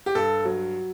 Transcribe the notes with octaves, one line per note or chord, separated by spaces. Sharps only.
G4
G2 A4
F#3